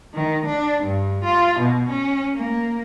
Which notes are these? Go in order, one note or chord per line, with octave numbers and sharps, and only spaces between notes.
D#3
D4
G2
F4
B2
C#4
A#3